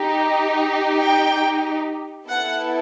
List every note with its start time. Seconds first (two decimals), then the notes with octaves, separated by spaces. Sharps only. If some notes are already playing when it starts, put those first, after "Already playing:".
Already playing: D#4 G4
1.00 G5
2.28 B3 E4 A4 F#5